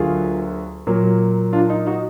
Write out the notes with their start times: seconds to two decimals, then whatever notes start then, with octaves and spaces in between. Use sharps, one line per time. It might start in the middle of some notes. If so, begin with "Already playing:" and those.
Already playing: D2 D3 F#3 A#3 F4 G#4
0.87 A#2 F#3 A#3
1.53 D4 F4
1.70 D#4
1.86 D#4 F#4